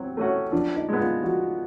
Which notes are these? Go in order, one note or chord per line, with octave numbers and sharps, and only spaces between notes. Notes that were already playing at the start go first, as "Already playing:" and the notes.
Already playing: F#3 C4
A3 C#4 F#4
F3 D4
D#4
G#3 B3
F4
F3 F#4